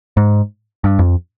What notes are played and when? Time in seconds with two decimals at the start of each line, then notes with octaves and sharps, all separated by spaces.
0.17 G#2
0.84 G2
0.99 F2